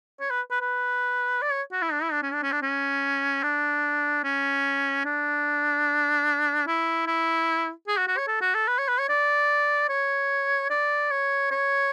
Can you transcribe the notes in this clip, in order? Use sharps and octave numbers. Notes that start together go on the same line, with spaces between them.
C#5
B4
B4
B4
D5
C#5
F#4
E4
D4
E4
D4
C#4
D4
C#4
D4
C#4
D4
C#4
D4
E4
E4
G#4
F#4
F#4
C#5
A4
F#4
A4
B4
C#5
B4
C#5
D5
C#5
D5
C#5
C#5